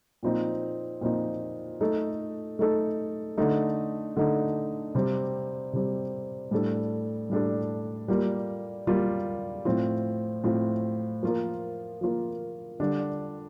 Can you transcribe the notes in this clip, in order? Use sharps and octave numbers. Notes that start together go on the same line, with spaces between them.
A#2 F3 C4 D#4
A#2 F3 C4 D#4
A3 D#4 A4
A3 D#4 A4
D3 A3 D#4
D3 A3 D#4
C3 G3 C4
C3 G3 C4
A2 G3 D4 A4
A2 G3 D4 A4
G3 A#3 F4
G3 A#3 F4
A2 F3 C4 F4
A2 F3 C4 F4
F3 A#3 F4 A#4
F3 A#3 F4 A#4
D3 G3 D4